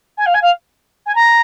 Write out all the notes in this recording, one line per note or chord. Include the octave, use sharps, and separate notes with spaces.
G#5
F5
G#5
F5
G#5
A#5